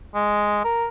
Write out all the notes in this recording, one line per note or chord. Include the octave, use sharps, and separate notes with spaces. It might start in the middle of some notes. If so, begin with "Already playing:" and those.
G#3
A#4